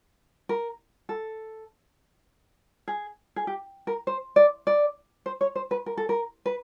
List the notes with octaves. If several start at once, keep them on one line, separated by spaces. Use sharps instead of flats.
A#4
A4
G#4
G#4
G4
A#4
C5
D5
D5
C5
C#5
C5
B4
A#4
A4
A#4
B4